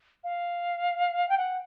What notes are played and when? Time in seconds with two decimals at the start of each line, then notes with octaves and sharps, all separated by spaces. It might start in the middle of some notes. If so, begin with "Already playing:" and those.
0.24 F5
1.29 G5
1.38 F#5